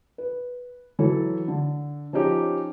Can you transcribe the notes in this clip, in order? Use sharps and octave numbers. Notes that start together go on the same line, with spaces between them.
B4
E3 F#3 E4 A4 C#5
D3
F3 C#4 D#4 G4